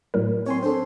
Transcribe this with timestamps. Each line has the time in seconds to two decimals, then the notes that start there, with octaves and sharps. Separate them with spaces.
0.14 A2 F#3 A#4
0.46 C4 C#5 G#5 C6
0.63 D4 A4 C5